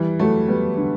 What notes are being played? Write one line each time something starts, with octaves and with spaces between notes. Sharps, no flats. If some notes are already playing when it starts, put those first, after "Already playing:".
Already playing: E3 G3
F#3 A3
G3 B3
D3